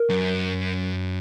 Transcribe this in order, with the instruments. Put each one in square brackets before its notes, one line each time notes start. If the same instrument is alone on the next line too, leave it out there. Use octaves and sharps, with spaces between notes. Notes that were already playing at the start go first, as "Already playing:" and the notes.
Already playing: [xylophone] A#4
[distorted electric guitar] F#2